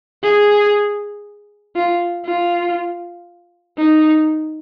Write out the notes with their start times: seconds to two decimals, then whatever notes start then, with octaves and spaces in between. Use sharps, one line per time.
0.23 G#4
1.76 F4
2.25 F4
3.77 D#4